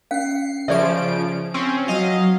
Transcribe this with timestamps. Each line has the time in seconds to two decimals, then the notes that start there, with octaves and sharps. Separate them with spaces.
0.11 C#4 F5 C7 C#7
0.68 C#3 F3 G#4 D5 E5 D7
1.54 C4 C#4
1.88 F#3 D#5 F5